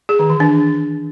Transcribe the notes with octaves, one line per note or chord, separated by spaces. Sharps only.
G#4
D#3
E3
D4